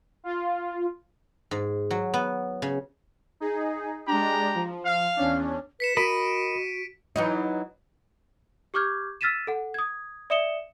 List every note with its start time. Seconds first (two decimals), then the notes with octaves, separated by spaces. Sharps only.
0.24 F4
1.51 G#2
1.91 F#3
2.14 B3
2.62 C#3
3.40 D#4 G#4
4.07 G#3 D4 G4 A#5
4.55 F3
4.86 F5
5.17 E2 C#4 D4
5.80 B4 B6 C#7 E7
5.97 F#4 A#4 D#5 B5 D7 D#7
7.16 E3 F#3 D#4
8.74 G4 C#6 D6 F6 G6 G#6
9.21 E6 F6 A6 B6 D#7 E7
9.47 A4 F#5
9.74 D#6 G#6
10.30 D5 E5 D#6 C#7 E7 G7